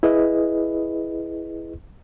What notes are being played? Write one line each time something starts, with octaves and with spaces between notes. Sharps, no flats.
E4 G#4 B4 D#5